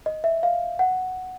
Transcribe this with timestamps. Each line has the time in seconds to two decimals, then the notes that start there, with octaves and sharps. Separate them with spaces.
0.06 D#5
0.24 E5
0.43 F5
0.79 F#5